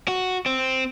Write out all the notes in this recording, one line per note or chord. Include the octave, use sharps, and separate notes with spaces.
F#4
C4